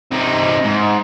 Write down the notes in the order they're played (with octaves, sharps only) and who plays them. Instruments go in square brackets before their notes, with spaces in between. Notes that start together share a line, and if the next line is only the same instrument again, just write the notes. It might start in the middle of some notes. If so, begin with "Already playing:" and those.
[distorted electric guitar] C3 D#4
G#2